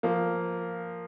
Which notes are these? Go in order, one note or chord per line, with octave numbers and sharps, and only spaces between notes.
F3 A#3